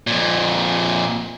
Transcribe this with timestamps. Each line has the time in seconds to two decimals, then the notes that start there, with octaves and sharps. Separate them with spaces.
0.07 F2 A#2